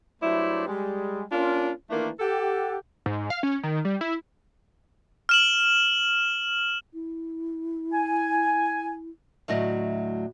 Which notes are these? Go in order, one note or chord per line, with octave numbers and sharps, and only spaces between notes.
G2 F#3 A3 E4 C5 D5
G3 G#3
A#3 C#4 D4 F4
D#3 E3 A3 A#3 D4 F4
G4 A4 F#5
G#2
F5
C#4
D#3
G3
E4
F6 E7 F#7
E4
G#5
D2 A2 F#3 D#5